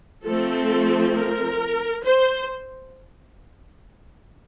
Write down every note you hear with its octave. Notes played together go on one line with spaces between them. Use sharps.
F3 A3 C4 A4
A#4
C5